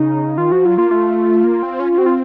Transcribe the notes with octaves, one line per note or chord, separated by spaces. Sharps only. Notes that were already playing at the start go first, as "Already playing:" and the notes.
Already playing: C#3 D#4
D#3 F4
F3 F#4
F#3 F4
A#3 F4
A3 F4
A#3
C4
C#4
C#4
C4 F#4
F4